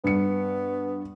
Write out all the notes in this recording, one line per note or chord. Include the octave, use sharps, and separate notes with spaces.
G2 B3 C#7